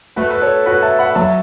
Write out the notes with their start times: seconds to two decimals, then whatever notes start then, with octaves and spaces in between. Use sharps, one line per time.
0.16 A3 F#4 B4
0.31 B4
0.42 A4 C#5
0.66 F#4 B4
0.83 E5 A5
0.99 F#5 B5
1.15 F#3 E5 A5